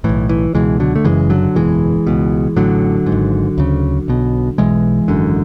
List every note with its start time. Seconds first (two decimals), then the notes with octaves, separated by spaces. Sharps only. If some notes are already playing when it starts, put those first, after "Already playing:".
0.04 B1 A2 E3
0.29 E3
0.54 C#2 B2 E3 G#3
0.80 D3 F#3
0.95 A3
1.05 F#1 F#2 C#3 E3 G#3
1.30 D3 F#3
1.55 F#1 E2 B2 E3 G#3
2.07 C#2 B2
2.56 A1 A2 D3 F#3
3.06 G#2
3.12 G#1
3.58 D2 C#3
4.08 B1 B2
4.58 B1 B2 E3 G#3
5.08 G#1 F#2 D3